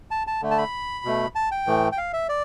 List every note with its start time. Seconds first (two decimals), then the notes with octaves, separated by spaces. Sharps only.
0.11 A5
0.27 A5
0.42 D3 A3
0.51 A5
0.58 B5
1.05 B2 A3
1.35 A5
1.51 G5
1.67 A2 E3 A3
1.92 G5
1.98 F5
2.13 E5
2.29 D5